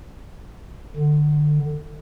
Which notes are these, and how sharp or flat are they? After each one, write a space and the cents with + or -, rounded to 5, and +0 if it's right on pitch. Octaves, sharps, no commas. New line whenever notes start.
D3 +25